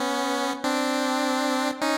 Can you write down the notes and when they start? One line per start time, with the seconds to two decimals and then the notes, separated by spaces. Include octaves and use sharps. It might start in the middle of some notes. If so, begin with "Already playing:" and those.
Already playing: B3 C#4
0.64 C4 D4
1.81 C#4 D#4